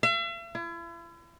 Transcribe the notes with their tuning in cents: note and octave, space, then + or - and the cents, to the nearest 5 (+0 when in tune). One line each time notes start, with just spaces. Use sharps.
E5 +45
E4 +40